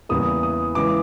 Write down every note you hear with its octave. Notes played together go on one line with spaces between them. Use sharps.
E2 C#3 E3 G3 A#3 D#6
D#6
C#3 E3 G#3 D6